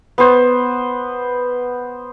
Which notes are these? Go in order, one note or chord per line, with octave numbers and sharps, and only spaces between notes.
B3 C5